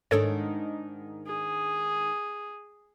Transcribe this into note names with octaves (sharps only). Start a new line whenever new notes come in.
G#2 D#3 D4 A4 C#5
G#4